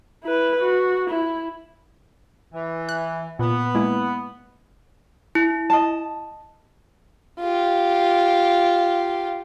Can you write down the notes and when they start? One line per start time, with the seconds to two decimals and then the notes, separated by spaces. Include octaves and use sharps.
0.23 E4 B4
0.62 F#4
1.10 E4
2.53 E3
2.89 F#6
3.39 A#2 B3
3.75 G#3 A#3 E4
5.35 E4
5.70 D#5 A5
7.40 F4 G4